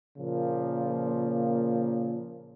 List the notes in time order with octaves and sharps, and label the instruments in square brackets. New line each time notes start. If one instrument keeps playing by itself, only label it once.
[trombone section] A#2 C#3 F3 A#3